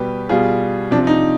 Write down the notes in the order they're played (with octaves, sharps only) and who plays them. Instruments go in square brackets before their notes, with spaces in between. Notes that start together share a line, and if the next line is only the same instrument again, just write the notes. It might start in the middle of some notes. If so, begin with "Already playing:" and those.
Already playing: [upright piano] B2 G3 G4 B4
B2 G3 F4 G#4
C3 F3 D4
D#4